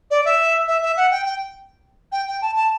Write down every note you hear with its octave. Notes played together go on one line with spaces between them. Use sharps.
D5
E5
E5
E5
F#5
G5
G5
G5
G5
A5
A5